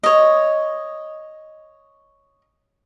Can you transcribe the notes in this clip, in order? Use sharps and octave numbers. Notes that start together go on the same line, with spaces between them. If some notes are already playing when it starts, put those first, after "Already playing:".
C#5 D#5